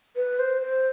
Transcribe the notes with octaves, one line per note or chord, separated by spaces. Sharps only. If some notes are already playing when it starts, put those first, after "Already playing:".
B4
C5
C5